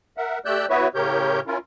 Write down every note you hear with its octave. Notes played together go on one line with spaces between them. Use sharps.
A#4 E5 F#5
A3 G4 D5 E6 F#6 G6
B3 E4 F#4 B4 C#5 E5
A2 C#3 G4 A#4 C#5 G6
C#4 E4 F4 A#4